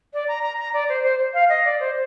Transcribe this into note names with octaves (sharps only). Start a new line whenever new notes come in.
D5
A#5
A#5
A#5
D5
C5
C5
F5
D#5
D5
C5